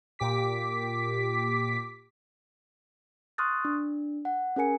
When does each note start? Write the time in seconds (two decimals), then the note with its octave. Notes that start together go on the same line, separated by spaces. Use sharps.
0.19 A#2 G4 D6 B6
3.38 C6 C#6 D#6 F6 F#6 A6
3.65 D4
4.25 F#5
4.56 C#4 G#4 A#4 G#5 C#7